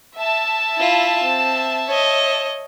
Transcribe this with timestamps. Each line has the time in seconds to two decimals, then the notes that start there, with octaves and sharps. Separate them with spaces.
0.17 E5 A5
0.78 E4 F4
1.23 C4
1.88 C#5 D#5